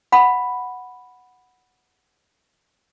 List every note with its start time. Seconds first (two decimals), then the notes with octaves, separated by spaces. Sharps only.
0.12 F#5 B5